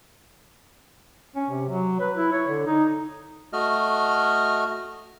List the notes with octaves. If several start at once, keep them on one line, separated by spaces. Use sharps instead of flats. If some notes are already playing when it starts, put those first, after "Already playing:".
C#4
C3
F#3
B4
E4
C#5
D3
D#4
A3 F#4 D#5 F6